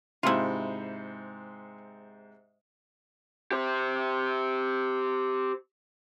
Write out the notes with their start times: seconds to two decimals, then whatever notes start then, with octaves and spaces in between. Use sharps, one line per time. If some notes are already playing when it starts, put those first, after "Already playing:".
0.23 G#2 C3 E4 F4
3.52 G4 C5